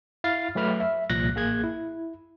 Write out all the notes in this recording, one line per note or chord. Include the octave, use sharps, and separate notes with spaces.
E4 F5 F6 A6 C7
F#3 A3 B4 B5 F6
E5
C2 A#2 F3 F#6 A#6
A1 A#3 G#4 F#6 G#6
E4